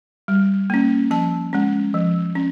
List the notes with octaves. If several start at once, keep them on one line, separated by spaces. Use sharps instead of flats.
G3
A#3 C#4
F3 A5
G#3 C#4
F3
C#4